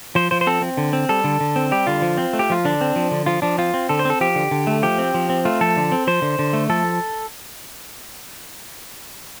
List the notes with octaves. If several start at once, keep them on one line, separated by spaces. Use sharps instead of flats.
F3 C5
F3 C5
C5
C4 A4
C4
D3
C4
G3 A4
D3
D3
C4
G3 G4
D3 F4
F3
C4
A3
G4
F3 F4
D3 D4
C4
F3
D3
F3 F4
F3 D4
C4 F4
C4
D3 A4
C5
C4 A4
F3 G4
D3
D3
A3
F3 G4
C4
F3
C4
A3 F4
F3 A4
D3
C4
F3 C5
D3
D3
A3
F3 A4